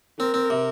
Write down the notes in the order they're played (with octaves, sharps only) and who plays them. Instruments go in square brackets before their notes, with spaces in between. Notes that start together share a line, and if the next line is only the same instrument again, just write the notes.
[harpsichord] C4 [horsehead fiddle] A#4
[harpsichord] C4
C3